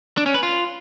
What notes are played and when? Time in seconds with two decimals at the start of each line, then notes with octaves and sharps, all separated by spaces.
0.17 D4
0.26 C#4
0.34 B4
0.43 F4